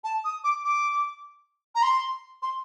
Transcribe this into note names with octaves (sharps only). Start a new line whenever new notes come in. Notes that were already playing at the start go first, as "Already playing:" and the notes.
A5
D#6
D6
D6
A#5
C6
C6